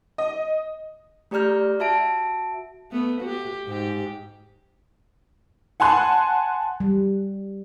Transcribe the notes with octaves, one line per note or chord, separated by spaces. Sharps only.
D#5
A3 G4 D5 A#5 F6 G6
F#4 E5 A5 D7
A3 B3
F#4 G4
G#2 G4
F#5 G#5 A5 C6 F#6
G3